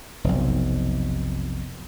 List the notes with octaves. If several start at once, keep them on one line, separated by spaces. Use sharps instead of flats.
F1 B1